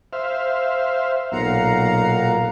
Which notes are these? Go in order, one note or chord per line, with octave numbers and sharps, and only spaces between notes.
C5 E5 F5
B1 A#2 F5 F#5 A#5